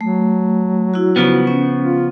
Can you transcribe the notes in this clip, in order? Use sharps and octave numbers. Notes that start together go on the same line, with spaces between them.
F#3 A3
E4 F#4
C#3 F3 B3
C#4
F4